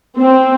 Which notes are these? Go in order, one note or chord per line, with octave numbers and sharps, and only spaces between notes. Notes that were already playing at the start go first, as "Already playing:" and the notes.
C4